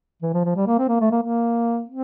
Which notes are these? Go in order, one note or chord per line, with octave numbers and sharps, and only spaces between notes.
E3
F3
F3
G3
A#3
C4
A#3
A3
A#3
A#3
C4